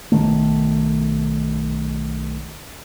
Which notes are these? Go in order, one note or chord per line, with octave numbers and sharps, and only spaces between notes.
B1 D#3 A3